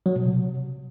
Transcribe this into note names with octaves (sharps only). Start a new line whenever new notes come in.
F#3
B2
C3